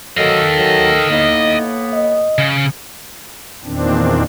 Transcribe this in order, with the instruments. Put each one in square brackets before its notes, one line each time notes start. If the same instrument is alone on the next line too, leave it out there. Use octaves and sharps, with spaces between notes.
[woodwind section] D#3 A4 [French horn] F#3 [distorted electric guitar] D#5 F5
[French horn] F#3
[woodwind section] A2 A#3 B3 [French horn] D#4
[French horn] D#5
[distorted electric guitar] C#3
[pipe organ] E2 A#2 D#3 C4 D4